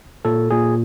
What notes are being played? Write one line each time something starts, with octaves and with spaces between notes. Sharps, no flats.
A#2 A4
A#2 G#4